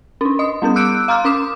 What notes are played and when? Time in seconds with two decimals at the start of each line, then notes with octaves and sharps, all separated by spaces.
0.21 C#4 D4
0.39 D#5 D#6
0.62 G3 B3 C#4 G6
0.76 D6 E6 F#6 G6 D7
1.08 F5 A#5 C6 F6 G6
1.25 C#4 D6 D#6 E7